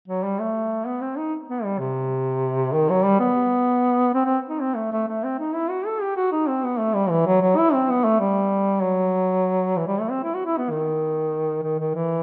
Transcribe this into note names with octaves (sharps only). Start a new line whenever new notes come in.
F#3
G3
A3
B3
C4
D#4
B3
G3
C3
D#3
F#3
G3
B3
C4
C4
D#4
C4
A3
A3
A3
C4
D#4
E4
F#4
A4
G4
F#4
D#4
C4
B3
A3
G3
E3
F#3
F#3
E4
C4
B3
A3
G3
F#3
E3
G3
A3
C4
E4
F#4
E4
B3
D#3
D#3
D#3
E3